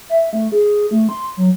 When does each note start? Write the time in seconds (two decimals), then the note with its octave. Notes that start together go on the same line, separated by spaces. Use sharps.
0.09 E5
0.33 A3
0.52 G#4
0.91 A3
1.09 C6
1.37 F#3